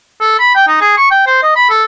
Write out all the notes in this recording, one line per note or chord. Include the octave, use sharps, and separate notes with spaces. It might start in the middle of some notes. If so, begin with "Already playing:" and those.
A4
B5
G5
D#4
G#4
C#6
G5
C5
D#5
B5
A4